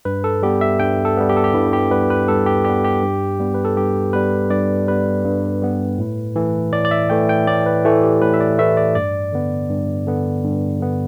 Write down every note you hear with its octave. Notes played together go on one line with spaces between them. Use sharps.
G2 B4
A4
G3 B3 G4
E5
G2 G5
A4
G3 B3
G4
A4
G4
G2 E4
G4
G3 B3 B4
B4
G2 A4
G4
G3 B3 G4
G4
G2
G3 B3
B4
A4
G2 G4
G3 B3 B4
G2 D5
G3 B3 B4
G2
G3 B3
A2
E3 A3
A2 D5
D5
E5
E3 A3 G5
G5
A2 D5
B4
E3 A3 A4
G4
A2 B4
E5
D5
E3 A3 E5
D5
G2 D5
D3 B3
G2
D3 B3
G2
D3 B3